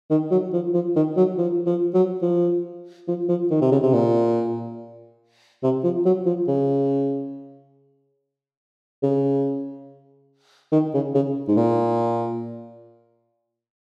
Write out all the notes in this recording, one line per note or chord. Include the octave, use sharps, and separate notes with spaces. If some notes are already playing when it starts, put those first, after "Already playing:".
D#3
F#3
F3
F3
D#3
F#3
F3
F3
F#3
F3
F3
F3
D#3
C3
C#3
C3
A#2
C3
F3
F#3
F3
C#3
C#3
D#3
C#3
C#3
G#2
A#2